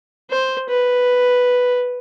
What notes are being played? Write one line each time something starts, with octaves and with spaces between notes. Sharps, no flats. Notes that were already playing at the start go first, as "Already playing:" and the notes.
C5
B4